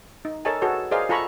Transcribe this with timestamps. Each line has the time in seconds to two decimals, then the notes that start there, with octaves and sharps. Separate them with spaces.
0.25 D#4
0.45 A4 A#4 C#5 D#5 G#5 A5
0.62 F#4 G#4 A4 B4 C#5
0.91 G#4 A#4 C5 D5 D#5 F5
1.09 F4 A4 G#5 A#5 B5 C#6